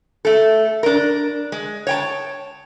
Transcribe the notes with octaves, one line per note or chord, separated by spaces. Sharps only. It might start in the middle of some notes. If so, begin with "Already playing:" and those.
A3 A4
D4 A#4
G#3
C#5 G5 A5